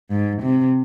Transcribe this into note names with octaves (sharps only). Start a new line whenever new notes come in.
G#2
C3